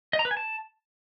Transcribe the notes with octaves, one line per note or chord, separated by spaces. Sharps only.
D#5
A#5
B4
G#5
A5